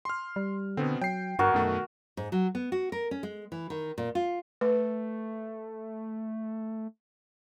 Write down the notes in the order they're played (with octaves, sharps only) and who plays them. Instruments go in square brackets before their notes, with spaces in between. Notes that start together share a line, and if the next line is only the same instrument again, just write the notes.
[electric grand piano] C6 F6
[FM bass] G3
[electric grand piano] B2 B3 C4 [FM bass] D3
[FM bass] F#3 [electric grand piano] G5 C7
[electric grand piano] G1 [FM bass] G2 [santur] F#4 A#4
[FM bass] F#2 [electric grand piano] B2 D#3 A3
[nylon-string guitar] G#2
F#3
B3
F#4
A#4
C#4
G#3
E3
D#3
A#2
F4
[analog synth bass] A3 [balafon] B4